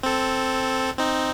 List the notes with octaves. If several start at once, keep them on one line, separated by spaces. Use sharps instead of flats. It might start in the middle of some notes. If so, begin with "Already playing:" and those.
C4 A4
C4 D#4